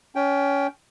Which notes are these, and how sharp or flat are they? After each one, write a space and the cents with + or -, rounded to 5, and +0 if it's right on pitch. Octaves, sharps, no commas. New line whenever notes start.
C#4 +20 G5 +0